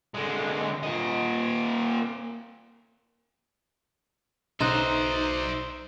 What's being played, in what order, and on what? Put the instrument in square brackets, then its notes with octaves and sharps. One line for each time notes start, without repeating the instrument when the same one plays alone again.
[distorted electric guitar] D3 G#3
A#2 D#5
[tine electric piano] B1 D#6 F#6 [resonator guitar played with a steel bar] D#4 [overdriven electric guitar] C5 [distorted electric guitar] D5 E5